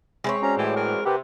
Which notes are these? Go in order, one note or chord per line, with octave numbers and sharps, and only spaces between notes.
G#3 C4 C#5 E5 B5
C#4 F#4 C5 D5 A#5
A2 E3 E4 G4
E3 A#4
C3 G4 A#4 B4 F#5